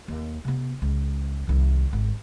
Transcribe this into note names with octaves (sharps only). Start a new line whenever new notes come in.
D#2
C3 B3
C#2
C2 D#3
G#1 D#3